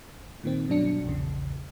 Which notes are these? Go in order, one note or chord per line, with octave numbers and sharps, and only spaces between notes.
A#2 D#3 C4
G2 B2 F#3 D4 C#7
A#1 E2 C#3